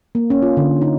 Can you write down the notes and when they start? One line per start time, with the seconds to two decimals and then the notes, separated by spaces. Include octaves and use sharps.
0.15 A#3
0.30 C#4
0.42 F4
0.57 D3
0.81 D#4